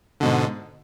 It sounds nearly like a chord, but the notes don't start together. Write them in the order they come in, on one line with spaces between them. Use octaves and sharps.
D3 B2 G#2